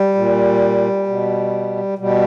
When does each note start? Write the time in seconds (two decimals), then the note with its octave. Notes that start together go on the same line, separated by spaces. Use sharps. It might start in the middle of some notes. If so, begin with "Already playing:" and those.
Already playing: G3
0.15 A#2
1.07 B2
1.98 B2 G3